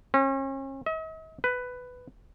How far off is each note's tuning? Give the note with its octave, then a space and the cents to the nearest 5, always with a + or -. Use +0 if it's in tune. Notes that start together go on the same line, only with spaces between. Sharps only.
C#4 -40
D#5 +45
B4 +10